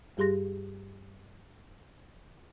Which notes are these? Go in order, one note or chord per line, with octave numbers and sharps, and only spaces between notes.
G2 G3 G4 G#4 C6 A#6